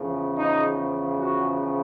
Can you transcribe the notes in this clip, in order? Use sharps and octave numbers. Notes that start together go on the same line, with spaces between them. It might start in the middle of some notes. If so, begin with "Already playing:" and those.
Already playing: E2 C#3 F3
D#4
F#4